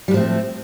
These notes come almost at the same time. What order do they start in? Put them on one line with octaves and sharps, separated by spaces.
G3 A2 F3 A3 C4